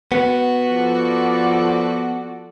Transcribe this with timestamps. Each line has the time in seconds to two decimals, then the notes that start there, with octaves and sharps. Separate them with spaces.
0.12 B3 F#4
0.68 F3 A4 D5